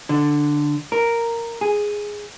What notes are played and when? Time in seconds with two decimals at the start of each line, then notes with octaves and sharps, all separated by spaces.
0.09 D3
0.92 A#4
1.61 G#4